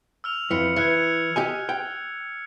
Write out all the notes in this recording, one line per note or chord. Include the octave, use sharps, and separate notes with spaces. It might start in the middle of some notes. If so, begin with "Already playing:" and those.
E6 F6 F7
F2 E3 F6 C#7
E3 F#6 G#6 C#7
G4 D#5 G#5
G5